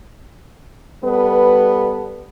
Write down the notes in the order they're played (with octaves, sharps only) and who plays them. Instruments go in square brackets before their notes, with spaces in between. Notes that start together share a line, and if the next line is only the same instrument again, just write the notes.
[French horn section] G3 B3 A4 B4